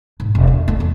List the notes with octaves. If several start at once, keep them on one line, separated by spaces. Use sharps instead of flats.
G#2
E1
D4
A3
E2